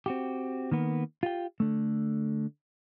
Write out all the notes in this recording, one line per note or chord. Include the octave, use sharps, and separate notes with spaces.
C4 F#4 G4
D#3 A#3 B3
F4 G4 G5
D3 A3